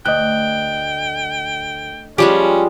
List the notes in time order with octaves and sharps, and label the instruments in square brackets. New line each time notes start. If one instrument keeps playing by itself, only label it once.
[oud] D2 [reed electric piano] D#5 F#6 [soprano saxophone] G5
[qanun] F3 G3 G#3 [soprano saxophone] C#4 [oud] G4